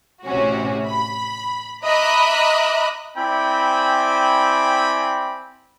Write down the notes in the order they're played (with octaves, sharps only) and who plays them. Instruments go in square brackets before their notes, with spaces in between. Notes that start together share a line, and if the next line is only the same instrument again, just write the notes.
[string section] A1 C3 C#4 F#4
B5
D#5 E5 A#5 B5 D6 F#6
[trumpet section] C4 E4 D5 G5 G#5 B5